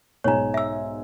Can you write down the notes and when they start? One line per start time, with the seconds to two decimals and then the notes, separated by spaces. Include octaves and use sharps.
0.24 B1 G#2 C#5 G#5 A#5
0.54 E5 E6